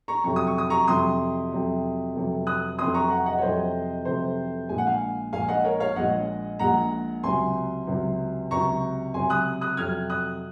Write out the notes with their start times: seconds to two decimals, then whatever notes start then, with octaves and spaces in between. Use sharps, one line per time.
0.08 A#5 C#6
0.24 F2 C3 F#3 C#6
0.36 D#6
0.47 C#6
0.58 D#6
0.70 A#5 C#6
0.88 F2 C3 F#3 C6 D#6
1.51 F2 C3 F#3
2.15 F1 F2 C3 F#3
2.47 D#6 F#6
2.78 F1 F2 C3 F#3 C6 D#6
2.94 A#5 C#6
3.10 F#5 A#5
3.26 D#5 F#5
3.38 C#5
3.42 F1 F2 C3 F#3 C5 D#5
4.05 F1 F2 C3 F#3 C5
4.69 A#1 A#2 G#3 G#5
4.78 F#5
4.87 F5 G#5
5.33 A#1 A#2 G#3 F5 G#5
5.49 D#5 F#5
5.64 A#4 C#5
5.80 C#5 F5
5.96 A#1 A#2 G#3 D#5 F#5
6.59 A#1 A#2 G#3 F#5 A#5
7.23 C#2 C3 F#3 G#5 C6
7.87 C#2 C3 F#3
8.50 C#2 C3 F#3 A#5 C#6
9.14 C#2 C3 F#3 G#5 C6
9.30 D#6 F#6
9.61 D#6 F#6
9.77 F2 C3 F#3 F6 G#6
10.10 D#6 F#6